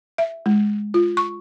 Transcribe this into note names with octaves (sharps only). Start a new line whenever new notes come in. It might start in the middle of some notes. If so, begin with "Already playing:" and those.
E5
G#3
F4
C#6